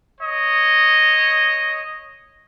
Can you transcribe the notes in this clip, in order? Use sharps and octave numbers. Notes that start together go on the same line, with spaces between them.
C#5 D#5